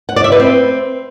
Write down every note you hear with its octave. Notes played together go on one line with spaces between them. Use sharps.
F#5
D5
E5
B4
C4